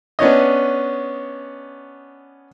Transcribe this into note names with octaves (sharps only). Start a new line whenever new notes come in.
B3 C#4 D4 C#5 D#5